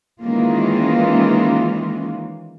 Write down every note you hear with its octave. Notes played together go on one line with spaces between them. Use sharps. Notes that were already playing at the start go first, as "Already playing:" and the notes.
D#3 E3 G#3 A#3 C#4 F4